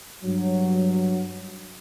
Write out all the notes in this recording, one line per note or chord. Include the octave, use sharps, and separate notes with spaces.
G2 F#3